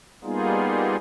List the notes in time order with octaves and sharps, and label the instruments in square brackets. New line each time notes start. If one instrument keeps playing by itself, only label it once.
[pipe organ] G3 A#3 B3 D#4 F4 G#4